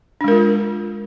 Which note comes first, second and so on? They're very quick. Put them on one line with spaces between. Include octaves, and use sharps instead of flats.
D4 G#3 A#4 F4